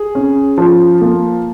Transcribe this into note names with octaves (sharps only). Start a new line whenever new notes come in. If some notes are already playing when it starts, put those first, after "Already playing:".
Already playing: G#4
C#4
F3
A#3